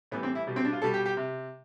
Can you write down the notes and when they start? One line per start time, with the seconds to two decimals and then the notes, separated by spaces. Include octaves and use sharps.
0.11 A2 E3 G3 B3
0.23 C4
0.35 E4
0.47 B2 G3
0.56 C4
0.65 D4
0.73 F4
0.82 B2 G3 A4
0.94 G4
1.06 G4
1.17 C3